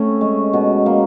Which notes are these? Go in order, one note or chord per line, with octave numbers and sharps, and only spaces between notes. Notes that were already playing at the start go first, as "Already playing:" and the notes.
Already playing: A3 C4 C#4
G#3
B2
A#3